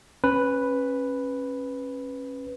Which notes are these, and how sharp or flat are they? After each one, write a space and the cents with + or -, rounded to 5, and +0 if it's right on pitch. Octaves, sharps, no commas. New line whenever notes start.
C#4 -25 B4 +0